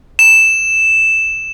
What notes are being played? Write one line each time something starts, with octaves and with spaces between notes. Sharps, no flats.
E7